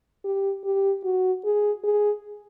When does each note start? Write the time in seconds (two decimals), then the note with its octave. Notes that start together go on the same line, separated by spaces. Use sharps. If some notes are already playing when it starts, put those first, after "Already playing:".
0.25 G4
0.64 G4
1.04 F#4
1.45 G#4
1.84 G#4